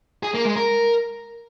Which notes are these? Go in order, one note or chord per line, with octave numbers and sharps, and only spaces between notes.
G#4
A#3
G#3
A#4